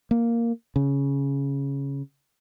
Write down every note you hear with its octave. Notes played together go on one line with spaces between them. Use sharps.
A#3
C#3